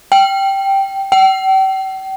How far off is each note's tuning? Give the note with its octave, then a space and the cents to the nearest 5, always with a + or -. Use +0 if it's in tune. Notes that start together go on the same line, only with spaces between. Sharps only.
G5 -5
G5 -40